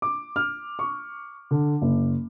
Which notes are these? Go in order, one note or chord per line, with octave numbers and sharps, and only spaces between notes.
D6
F6
C#6
D3
F#1